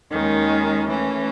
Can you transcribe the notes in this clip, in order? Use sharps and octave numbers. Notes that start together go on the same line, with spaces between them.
D#2 D#3 G#3 C#4
E3 A3 C#4